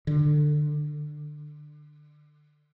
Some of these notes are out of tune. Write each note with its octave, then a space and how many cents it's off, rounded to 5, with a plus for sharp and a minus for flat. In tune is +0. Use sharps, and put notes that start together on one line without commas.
D3 +25